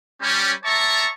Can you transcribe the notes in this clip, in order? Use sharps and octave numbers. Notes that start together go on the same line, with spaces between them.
G3 C#4
C#5 D5 E5 A5 A#5 C#6